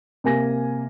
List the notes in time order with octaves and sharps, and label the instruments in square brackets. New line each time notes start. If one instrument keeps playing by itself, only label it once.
[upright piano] C3 A#3 G#5 A#6